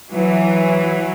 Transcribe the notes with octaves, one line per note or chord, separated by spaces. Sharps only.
E3 F#3